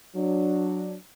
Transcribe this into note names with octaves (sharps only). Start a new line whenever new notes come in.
F#3 D4